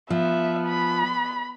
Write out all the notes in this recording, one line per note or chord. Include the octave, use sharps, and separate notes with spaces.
F3 B3 E5
B5